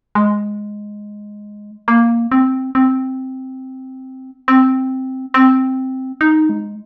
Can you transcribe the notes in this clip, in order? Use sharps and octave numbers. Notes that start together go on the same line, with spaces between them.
G#3
A#3
C4
C4
C4
C4
D#4
G#3